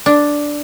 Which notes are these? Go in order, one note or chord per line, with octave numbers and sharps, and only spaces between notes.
D4